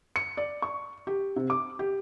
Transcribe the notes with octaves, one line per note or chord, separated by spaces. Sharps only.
C#7
D5
C#6
G4
C3
D6
G4